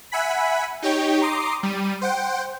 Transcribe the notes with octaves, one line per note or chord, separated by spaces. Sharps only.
E5 F#5 G#5 B5 B6
D#4 G4 C#5 G5
A#5 C6 D6 D#6 C7
G3 D#7
C5 F#5 G5